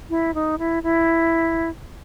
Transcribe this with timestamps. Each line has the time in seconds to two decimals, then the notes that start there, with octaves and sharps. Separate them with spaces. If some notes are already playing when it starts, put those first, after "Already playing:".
0.10 E4
0.34 D#4
0.59 E4
0.83 E4